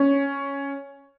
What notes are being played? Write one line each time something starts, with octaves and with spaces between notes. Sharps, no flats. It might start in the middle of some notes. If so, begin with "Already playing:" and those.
Already playing: C#4